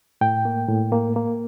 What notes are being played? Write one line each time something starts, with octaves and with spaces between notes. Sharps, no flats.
A2 G5
A#3
A2
A#3
A#3